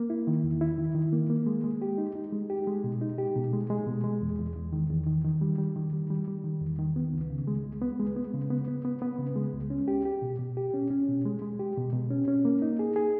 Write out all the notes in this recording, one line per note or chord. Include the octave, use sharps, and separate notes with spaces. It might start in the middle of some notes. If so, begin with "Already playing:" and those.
Already playing: A#3
E4
D#3
E2
E4
D#3
D#3
A#3
A#3
G#3
G#3
G4
D#4
D#4
G#3
G4
G#3
B2
D#4
G4
B2
G#3
G#3
B2
G#3
E2
E2
E2
D#3
E2
D#3
D#3
G3
G3
D#3
G3
G3
G3
D#3
E2
D#3
B3
C#2
C#3
G#3
C#2
B3
G#3
B3
C#3
B3
B3
B3
B3
C#3
G#3
C#2
C#4
G4
G4
B2
B2
G4
C#4
C#4
B2
G#3
G#3
G4
B2
B2
C#4
C#4
A#3
D#4
G#4
G#4